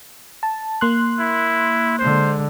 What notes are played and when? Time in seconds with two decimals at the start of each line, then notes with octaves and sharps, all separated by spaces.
0.43 A5
0.81 A#3 C6 F#6
1.19 E4
1.99 D3 G#3 C5